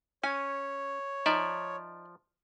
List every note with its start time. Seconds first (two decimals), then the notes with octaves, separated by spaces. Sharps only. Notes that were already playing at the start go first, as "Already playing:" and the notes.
0.24 C#4 C#5 G#5
1.26 F3 D#4 D5 E5